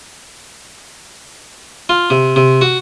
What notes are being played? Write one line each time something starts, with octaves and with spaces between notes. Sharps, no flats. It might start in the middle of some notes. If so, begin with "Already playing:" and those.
F4
C3
C3
F#4